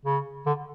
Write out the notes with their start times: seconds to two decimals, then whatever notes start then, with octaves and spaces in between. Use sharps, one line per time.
0.05 C#3
0.46 D3